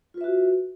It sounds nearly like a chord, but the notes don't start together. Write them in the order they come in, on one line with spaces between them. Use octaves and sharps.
F4 B4 E5 F#4